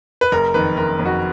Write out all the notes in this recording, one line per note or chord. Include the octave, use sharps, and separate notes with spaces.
B4
F#1 A#4
F2 D#3 B4
F#1 A#4
F2 D#3
F#4